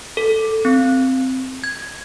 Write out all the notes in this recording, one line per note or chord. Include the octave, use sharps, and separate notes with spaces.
A4
C4
G#6